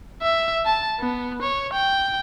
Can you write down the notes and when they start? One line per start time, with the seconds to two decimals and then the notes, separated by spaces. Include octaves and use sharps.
0.22 E5
0.65 A5
1.00 B3
1.42 C#5
1.73 G5